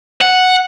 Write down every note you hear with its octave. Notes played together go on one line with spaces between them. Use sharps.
F#5